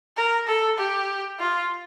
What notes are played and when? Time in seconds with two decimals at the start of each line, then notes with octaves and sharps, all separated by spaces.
0.17 A#4
0.47 A4
0.78 G4
1.39 F4